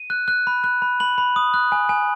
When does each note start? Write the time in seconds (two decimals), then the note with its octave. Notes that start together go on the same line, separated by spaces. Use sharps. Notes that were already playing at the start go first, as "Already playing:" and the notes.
Already playing: D#7
0.10 F#6
0.28 F#6
0.47 B5
0.64 F#6
0.82 B5
1.00 B5 F#7
1.18 B5
1.36 D#6
1.54 F#6
1.72 G#5
1.89 G#5